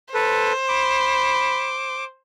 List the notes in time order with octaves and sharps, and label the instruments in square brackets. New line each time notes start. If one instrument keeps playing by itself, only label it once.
[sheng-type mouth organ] A4 B4 [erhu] C5
[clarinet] B5 [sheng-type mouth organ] D6